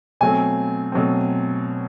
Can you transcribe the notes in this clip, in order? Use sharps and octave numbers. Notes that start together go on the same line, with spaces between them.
B2 F#3 A3 C4 G#5
B2 F#3 A3 C4